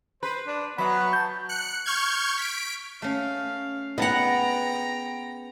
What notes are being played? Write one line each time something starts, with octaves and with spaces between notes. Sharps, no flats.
B4 C5
D4
F#3 B3 E5 B5
A5 G6
F#6 C#7
C#6 F6 G6 G#6
B6 D7
A3 C#4 F5
B3 G#4 D#5 F#5 G5 A#5